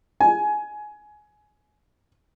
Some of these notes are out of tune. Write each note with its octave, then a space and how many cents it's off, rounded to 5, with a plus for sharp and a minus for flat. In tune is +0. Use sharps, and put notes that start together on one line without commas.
G#5 +20